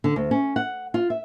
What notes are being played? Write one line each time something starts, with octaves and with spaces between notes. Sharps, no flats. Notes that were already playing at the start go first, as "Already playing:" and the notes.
D3
D2
C#4
F#5
F4
E5